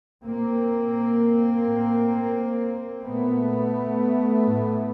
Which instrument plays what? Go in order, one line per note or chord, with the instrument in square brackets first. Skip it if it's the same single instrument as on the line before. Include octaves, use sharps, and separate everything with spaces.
[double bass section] A#2 A#3 C4
A2
A#2 A3 B3
A2